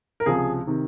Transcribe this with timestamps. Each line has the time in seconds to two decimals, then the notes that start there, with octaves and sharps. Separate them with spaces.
0.20 A#4
0.26 C#2 C3 F3 G#4
0.67 C3 D#3